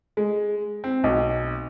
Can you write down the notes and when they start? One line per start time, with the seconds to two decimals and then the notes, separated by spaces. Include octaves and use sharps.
0.17 G#3
0.84 C4
1.04 B1